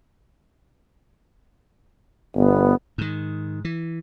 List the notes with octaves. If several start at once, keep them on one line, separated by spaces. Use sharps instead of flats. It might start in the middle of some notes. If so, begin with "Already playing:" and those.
G1 B3
G#2 D#3
E3